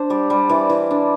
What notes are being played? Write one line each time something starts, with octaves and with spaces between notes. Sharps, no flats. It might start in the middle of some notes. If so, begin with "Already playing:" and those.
Already playing: D4 C5
G3 D5
G3
E3 D5
E3
D4